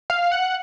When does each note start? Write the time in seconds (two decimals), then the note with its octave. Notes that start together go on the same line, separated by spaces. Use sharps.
0.10 F5
0.32 F#5